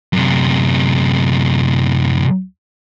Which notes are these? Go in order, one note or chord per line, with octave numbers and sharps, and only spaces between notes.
F#2 C3